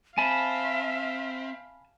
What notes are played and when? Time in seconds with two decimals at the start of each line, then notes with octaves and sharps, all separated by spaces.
0.18 C4 E5 F5 G#5 A5 B5